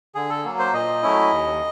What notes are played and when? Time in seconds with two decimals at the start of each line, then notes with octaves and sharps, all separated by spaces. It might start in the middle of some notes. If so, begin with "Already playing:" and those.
0.15 D3 G#4
0.29 A4
0.44 F#3 A#3
0.59 C5
0.73 A#2 D#5
1.03 F#3 A3 C#4 E4
1.31 D#2